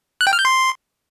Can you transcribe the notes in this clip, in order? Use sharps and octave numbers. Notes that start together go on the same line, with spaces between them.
F#6
G5
F6
G6
C6